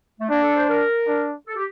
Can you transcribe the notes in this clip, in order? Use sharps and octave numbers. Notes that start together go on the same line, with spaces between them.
A3
A#3 D4
A4
C5
A#4
D4
A4
G4